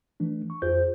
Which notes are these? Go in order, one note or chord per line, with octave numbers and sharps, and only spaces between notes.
E3 A3 D4
C#6
F2 F4 G#4 C5 G6